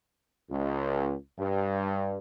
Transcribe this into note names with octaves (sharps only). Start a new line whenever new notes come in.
C#2
G2